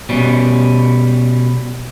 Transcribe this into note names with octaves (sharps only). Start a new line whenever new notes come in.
B2 G3 C#4